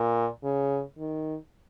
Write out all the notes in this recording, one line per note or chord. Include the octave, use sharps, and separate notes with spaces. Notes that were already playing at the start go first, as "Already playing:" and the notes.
Already playing: A#2
C#3
D#3